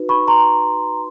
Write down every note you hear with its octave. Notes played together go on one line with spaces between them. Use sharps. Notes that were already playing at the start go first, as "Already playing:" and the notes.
Already playing: D#4 F#4 B4
B5 C#6
A#5 C6